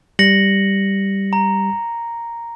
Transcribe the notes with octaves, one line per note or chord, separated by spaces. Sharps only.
G3 A#6 C#7 F#7
A#5